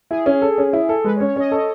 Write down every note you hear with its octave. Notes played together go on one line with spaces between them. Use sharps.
E4 G#4
C#4
A4
C#4
E4
A4
G#3 B4
C#5
C#4
C#5
C#4 D#5
A4